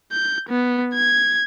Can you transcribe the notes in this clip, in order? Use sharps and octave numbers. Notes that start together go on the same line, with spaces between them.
G6
B3
G#6